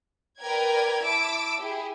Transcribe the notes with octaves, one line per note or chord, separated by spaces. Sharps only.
A#4 B4 D5 G5 G#6
E4 A5 D6 E6 D7
E4 G4 G#4